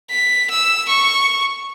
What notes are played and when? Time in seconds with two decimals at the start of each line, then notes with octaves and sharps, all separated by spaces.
0.11 B6
0.51 E6
0.89 C#6